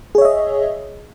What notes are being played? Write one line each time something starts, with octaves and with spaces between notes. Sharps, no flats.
G#4 C#5 D#5 E5